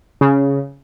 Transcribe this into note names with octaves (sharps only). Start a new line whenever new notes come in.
C#3